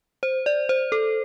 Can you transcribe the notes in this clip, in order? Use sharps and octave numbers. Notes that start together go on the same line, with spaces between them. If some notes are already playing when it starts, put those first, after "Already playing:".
C5
D5
C5
A4